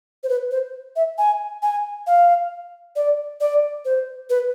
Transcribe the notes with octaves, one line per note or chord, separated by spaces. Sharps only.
C5
B4
C5
E5
G#5
G#5
F5
D5
D5
C5
B4